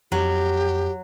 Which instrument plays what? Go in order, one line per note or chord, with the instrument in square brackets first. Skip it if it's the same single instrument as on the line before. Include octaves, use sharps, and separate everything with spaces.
[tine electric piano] F2 [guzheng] F#3 [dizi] G4